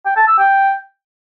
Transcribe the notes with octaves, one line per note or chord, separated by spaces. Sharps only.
G5
A5
E6
G5